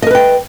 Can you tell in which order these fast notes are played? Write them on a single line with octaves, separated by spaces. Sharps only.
D#5 A#4 B4 G5